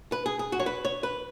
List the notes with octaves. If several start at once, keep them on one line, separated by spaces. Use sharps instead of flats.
B4
G#4
G#4
F#4
C#5
B4
C#5
B4